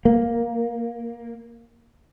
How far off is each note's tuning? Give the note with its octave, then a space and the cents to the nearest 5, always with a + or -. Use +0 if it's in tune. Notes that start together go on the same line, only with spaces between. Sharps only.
A#3 +5